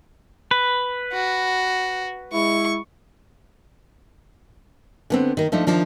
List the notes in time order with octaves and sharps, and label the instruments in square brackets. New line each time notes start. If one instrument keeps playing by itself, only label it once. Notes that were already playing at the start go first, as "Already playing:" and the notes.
[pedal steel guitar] B4
[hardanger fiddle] F#4
[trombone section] G#3 E4 [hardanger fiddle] C#6
[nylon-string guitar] D3 B3 C4
D#3 A#4
F3 A3 D4 D#4
D#3 F3 D4 D#4